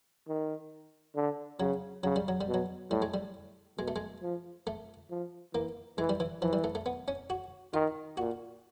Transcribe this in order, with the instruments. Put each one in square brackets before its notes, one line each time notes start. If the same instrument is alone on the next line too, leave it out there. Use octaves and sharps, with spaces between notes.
[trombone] D#3
D3
[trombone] C#3 [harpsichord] F#3
[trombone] C#3 [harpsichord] F#3
[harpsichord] G3
F#3
G3
[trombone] B2
[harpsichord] F#3
[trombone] A2 [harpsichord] G3
[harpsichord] G#3
G3
[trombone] B2 [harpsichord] G#3
[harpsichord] A3
G#3
[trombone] F3
[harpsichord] A3
[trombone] F3
[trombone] E3 [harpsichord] A#3
[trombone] E3 [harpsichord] G#3
[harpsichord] G3
E3
[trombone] E3 [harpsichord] F3
[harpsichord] G3
A3
A3
B3
C#4
F#4
[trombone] D#3 [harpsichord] F4
[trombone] A#2 [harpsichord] F#4